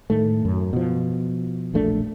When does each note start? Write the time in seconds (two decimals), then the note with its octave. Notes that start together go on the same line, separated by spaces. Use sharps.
0.10 A2 D#3 A3
0.45 F#2
0.73 B2 F3
1.74 E1 A#1 A3 D4